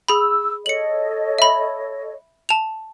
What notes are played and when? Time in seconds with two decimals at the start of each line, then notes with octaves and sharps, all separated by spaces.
0.09 G#4 B5 E6
0.66 A4 C#5 D#5 C#7 F#7
1.38 E5 B5
2.49 A5 F7